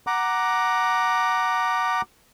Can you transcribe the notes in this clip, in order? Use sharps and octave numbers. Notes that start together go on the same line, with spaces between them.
F#5 A#5 D6